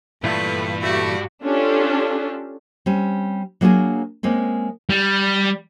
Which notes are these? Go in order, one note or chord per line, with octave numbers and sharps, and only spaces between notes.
G2 A#2 E3 A3 F4 B4
A3 F#4 G4
C#4 D4 F4 G4 A4
G3 C4 C#4
F#3 A#3 D4 G4 G#4 A#4
G#3 A#3 C4 C#4
G3